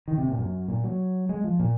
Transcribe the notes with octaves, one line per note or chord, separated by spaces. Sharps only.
D#3
C3
A#2
F#2
A#2
F#3
G#3
F3
A#2